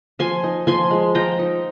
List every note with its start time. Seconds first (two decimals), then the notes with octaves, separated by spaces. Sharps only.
0.19 F3 G#5 C6
0.44 D#4
0.67 F3 G#5 C6
0.91 G#3
1.15 F3 G5 A#5
1.39 D#4